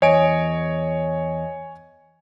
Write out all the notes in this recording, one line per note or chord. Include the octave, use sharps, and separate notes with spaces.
E2 C#5 D#5 G#5 D7